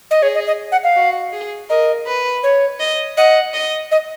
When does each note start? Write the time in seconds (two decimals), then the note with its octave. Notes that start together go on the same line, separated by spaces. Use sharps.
0.11 D#5
0.22 G#4 C#5
0.35 D#5
0.47 D#5
0.72 F#5
0.84 F5
0.96 F#4
1.33 G#4
1.70 A#4 D#5
2.07 B4
2.43 C#5
2.80 D#5
3.17 D#5 F#5
3.54 D#5
3.91 D#5